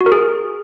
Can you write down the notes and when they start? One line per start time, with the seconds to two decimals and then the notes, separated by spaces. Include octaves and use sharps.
0.01 F#4
0.06 A#4
0.12 G#4